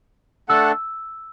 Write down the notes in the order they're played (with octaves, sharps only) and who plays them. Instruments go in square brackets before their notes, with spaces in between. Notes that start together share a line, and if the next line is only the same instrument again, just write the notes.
[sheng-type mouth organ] A3 D4 A4 F#5 A5 [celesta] E6